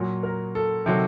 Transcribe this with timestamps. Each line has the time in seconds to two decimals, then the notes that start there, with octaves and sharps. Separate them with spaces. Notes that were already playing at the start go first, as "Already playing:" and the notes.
Already playing: A#2 F#3
0.23 A#4
0.55 A4
0.86 C3 D#3 F#3 A4